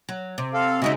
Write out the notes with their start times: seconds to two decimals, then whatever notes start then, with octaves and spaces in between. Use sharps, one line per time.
0.09 F#3
0.38 C3
0.54 C4 A4 F5
0.82 C#3 G#3 D#4 F#4 D#5 E5